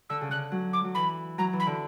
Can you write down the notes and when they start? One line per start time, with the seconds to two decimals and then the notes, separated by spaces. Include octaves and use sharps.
0.10 D3 E6
0.21 C#3
0.31 D3 F#6
0.52 F#3
0.73 D6
0.84 F#3
0.95 E3 B5
1.38 F#3 A#5
1.53 E3
1.60 B5
1.66 D3